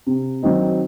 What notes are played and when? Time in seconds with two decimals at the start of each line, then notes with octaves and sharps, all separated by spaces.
0.07 C3
0.43 D#3 F#3 C4 D#4